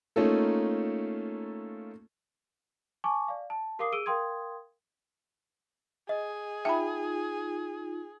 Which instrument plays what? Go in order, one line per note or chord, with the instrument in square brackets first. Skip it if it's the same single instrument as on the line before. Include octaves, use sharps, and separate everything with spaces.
[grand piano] A3 A#3 C#4 D#4 F4 A4
[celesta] G#5 A5 C#6 D6
D5 F5
A5
G4 A#4 F5 D6 D#6 C7
G#4 E6 D7 D#7 G7
A#4 F5 G5 C6 D#6 G#6
[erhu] G#4 [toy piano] D#5
[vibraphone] D#4 F4 [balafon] E5 B5 [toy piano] G5 A5